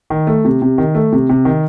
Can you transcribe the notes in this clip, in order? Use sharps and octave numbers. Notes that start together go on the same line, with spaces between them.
D#3
A3
C3
C3
D#3
A3
C3
C3
D#3